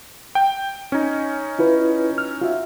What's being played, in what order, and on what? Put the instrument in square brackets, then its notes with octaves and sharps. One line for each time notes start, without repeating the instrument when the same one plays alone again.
[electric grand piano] G5
[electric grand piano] C#4 D#4 [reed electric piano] G#5
[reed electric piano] E4 F4 B4
F6
F4 F#4 E5